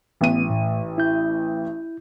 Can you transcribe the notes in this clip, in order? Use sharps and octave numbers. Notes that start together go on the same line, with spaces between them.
A1 E3 B3 D#7
A2
E4 G6